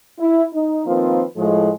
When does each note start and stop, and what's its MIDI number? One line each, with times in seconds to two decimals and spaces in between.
0.19 0.43 64
0.53 0.85 63
0.86 1.24 51
0.86 1.24 53
0.86 1.24 58
0.86 1.24 60
0.86 1.24 65
0.86 1.24 71
1.37 1.70 45
1.37 1.70 53
1.37 1.70 56